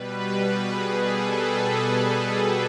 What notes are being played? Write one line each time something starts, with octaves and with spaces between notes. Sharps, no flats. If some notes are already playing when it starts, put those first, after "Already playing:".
Already playing: B2 G3 B4
G#4
A4
G#4